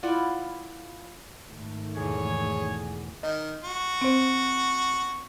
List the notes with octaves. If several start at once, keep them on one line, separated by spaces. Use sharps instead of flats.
E4 F4 D5 F#5
G#2 D#3 A3
E2 B2 G#4 C#5
D#3 D#5
F#4
C4 C5